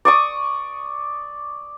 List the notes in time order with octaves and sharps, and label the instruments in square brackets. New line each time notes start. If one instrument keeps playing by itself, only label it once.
[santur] D5 C#6 D#6